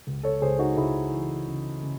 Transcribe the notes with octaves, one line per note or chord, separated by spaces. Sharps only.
C#2
A4 C#5
C#2 G#4 C5
D#4 F#4
C#2 E4 G#4
E3
C#3
C#3